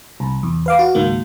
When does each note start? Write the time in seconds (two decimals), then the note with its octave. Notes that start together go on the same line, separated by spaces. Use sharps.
0.20 C2
0.43 E2
0.66 B4 F5 D6
0.79 F#4
0.95 C#2 G#2 D#3 A#3